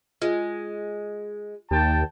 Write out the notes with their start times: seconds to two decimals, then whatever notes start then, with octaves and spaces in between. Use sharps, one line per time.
0.22 G#3 F4
1.71 D#2 G5 A5